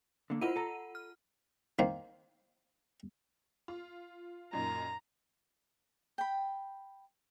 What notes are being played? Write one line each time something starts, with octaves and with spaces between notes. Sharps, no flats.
D3 A#3
E4 F4 A#4 C5 F#5 D#7
A4 A#5
F6
D#3 A#3 C5
F4
F#2 A#2 D#4 A#5
G5 B5